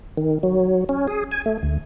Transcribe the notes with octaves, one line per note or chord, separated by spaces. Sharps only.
D#3
F#3
C#4
G#4
G#5
A3
D2